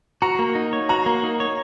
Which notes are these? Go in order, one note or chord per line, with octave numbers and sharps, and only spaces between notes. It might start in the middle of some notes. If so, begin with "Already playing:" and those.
F#4 A#5
A#3
D#4
C#5
F#4 A#5
A#3
D#4
C#5